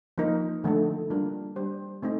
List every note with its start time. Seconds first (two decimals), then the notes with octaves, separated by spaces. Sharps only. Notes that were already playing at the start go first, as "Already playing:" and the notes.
0.18 F3 A#3 D#4 A#4
0.64 D3 F3 A3 D#4 A4
1.10 G3 A#3 D4 F4 A#4
1.56 G3 D4 G4 C5
2.02 A3 C4 D#4